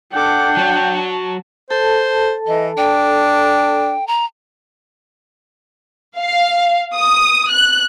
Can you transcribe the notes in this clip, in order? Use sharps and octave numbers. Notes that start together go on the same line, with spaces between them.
D4 A4 F#5 G5 D6
F#3 F#4 C#5 A5
A4 C5 A5
E3 D#5
D4 G5
A#5
F5
D#6
F#6